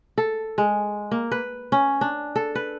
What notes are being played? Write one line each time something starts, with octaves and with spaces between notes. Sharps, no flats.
A4
G#3
A#3
B4
C#4
D4
A4
B4